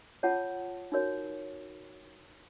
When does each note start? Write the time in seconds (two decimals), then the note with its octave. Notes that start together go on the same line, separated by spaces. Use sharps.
0.23 F4 G#4 C#5 F#5 A5
0.92 D#4 F#4 A#4 C#5